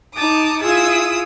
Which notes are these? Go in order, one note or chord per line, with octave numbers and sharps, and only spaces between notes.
D#4 A5 D6 D#6
E4 F4 G#4 D#6 E6